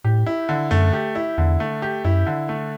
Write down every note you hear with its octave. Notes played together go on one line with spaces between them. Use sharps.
A2 G4
E4
D3
F#2 A3
G4
E4
E2 D3
A3
G4
F#2 E4
D3
A3